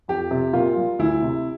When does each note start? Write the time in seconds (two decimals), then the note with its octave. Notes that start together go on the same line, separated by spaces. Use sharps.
0.08 F2 G4
0.31 C3
0.53 A#2 F4
0.76 G3
0.99 D2 E4
1.22 C3